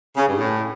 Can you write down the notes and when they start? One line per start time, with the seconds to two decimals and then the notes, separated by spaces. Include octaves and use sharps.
0.17 C#3
0.28 G2
0.38 A2